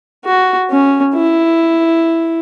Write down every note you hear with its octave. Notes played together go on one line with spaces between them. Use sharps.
F#4
C#4
E4